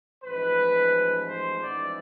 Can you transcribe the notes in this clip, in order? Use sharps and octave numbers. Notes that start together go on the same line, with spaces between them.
A1 G#2 F3 B4
C5
A1 G#2 F3 B3 E4 D5